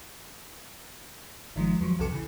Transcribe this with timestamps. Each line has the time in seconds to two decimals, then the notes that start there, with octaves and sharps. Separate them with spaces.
1.56 G#1 D#3 F3 G#3
1.80 E2 F3 F#3
1.99 B1 E2 C3 A4 D6 C#7
2.12 C#3 E3